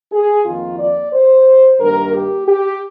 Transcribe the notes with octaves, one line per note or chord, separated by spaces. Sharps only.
G#4
F2 D#3 A#3 F4
D5
C5
G2 D#3 G3 A#3 A#4
G4
G4